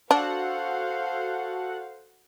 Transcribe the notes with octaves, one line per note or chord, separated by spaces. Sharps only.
D4 F#4 A4 C5 F5 F#5